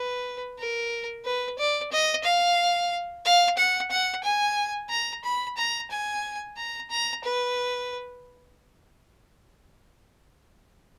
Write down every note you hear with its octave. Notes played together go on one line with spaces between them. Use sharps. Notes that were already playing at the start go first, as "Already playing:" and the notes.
Already playing: B4
A#4
B4
D5
D#5
F5
F5
F#5
F#5
G#5
A#5
B5
A#5
G#5
A#5
A#5
B4